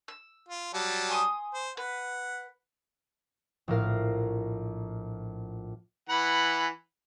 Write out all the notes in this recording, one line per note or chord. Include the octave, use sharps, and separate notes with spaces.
E6
F4
F#3 G3 A5
G#5 C6 D#6
C5
B4 F#5
A#1 A2 A#4 F5
E3 F#5 B5